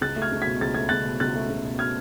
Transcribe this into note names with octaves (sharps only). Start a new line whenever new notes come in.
C#2 F#6 A6
A3
F6 G#6
C#2
G#6 B6
B2
C#2 A6
A3 G#6
C#2 F#6 A6
B2
C#2 F#6 A6
A3
C#2
B2
F6 G#6